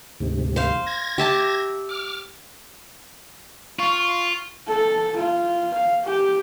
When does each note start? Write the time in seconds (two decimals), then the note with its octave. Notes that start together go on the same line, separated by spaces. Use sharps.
0.20 D2 G#2 C3
0.56 C5 F5
0.86 G#6 A#6
1.18 G4 E5 A5
1.89 D6 F6
3.79 F4 C#6
4.03 C#6
4.68 A4
5.17 F4
5.75 F5
6.05 G4